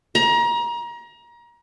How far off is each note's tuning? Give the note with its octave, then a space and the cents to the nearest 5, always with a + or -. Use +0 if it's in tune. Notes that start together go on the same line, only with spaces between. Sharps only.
A#5 +30